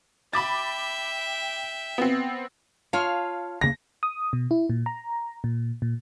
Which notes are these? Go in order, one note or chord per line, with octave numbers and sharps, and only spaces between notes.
E5 G5 B5 D6 A6
B3 C4
F4 C#5 F5 A5
D2 C#3 A#3 A#6
D#6
B2
E4
A#2
A#5
A#2
A#2